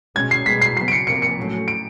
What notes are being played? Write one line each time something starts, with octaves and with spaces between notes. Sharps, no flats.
B2 G#3 C#4 G#6
C7
B2 G#3 B3 B6
C7
C#3 F#3 B3 C7
D7
C#7
C3 F3 A#3 C#7
C#7
A2 F#3 A3 C#4
D7